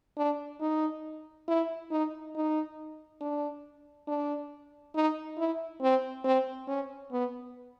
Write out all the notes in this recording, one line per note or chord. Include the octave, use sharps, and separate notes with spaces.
D4
D#4
E4
D#4
D#4
D4
D4
D#4
E4
C4
C4
C#4
B3